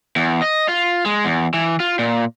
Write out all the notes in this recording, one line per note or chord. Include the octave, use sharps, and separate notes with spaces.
E2
D#5
F4
G#3
E2
E3
F4
A#2